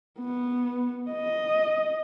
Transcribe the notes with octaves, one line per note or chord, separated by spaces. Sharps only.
B3
D#5